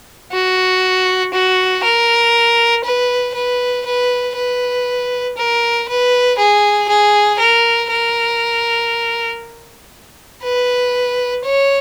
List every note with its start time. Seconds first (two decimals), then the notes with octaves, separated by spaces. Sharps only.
0.32 F#4
1.34 F#4
1.84 A#4
2.84 B4
3.35 B4
3.86 B4
4.36 B4
5.37 A#4
5.89 B4
6.38 G#4
6.88 G#4
7.39 A#4
7.91 A#4
10.43 B4
11.44 C#5